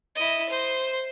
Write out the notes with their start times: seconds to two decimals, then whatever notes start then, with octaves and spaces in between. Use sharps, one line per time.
0.15 E4 D#5
0.49 C5